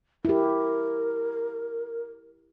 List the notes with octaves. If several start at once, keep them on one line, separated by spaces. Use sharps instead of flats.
E4 G4 A#4